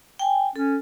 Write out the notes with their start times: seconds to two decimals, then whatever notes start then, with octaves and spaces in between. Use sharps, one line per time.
0.19 G5 G#5
0.56 C#4 A4